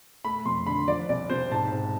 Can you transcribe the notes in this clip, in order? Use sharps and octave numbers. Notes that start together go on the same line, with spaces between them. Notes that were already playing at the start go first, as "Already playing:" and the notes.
A3 B5
F2 C6
D3 B5
F3 D5
C2 D5
C3 C5
G#2 A5
G#2